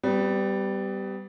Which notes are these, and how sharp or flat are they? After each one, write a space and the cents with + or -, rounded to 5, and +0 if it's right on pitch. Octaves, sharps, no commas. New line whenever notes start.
G3 -5 B3 +30